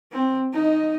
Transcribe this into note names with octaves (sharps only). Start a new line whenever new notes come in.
C4
D#4 D#5